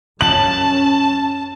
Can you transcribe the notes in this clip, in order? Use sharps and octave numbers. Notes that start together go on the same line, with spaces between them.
F#2 C#4 A5 F#7